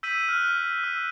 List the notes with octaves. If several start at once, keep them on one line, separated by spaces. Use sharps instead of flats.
E6 G6 B6 D#7 F#7
F6 F#6
E6